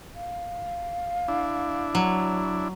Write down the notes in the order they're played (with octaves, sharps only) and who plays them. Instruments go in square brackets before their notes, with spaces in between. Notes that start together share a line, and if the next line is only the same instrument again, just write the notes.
[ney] F5
[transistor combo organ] D4 E4
[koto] F#3